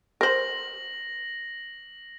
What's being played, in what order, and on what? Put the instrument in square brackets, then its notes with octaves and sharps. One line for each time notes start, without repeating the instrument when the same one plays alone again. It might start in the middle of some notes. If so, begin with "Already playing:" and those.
[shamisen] A#4 C5 [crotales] A#6 F#7